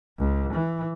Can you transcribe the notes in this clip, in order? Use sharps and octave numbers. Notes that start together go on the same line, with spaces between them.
C#2
E3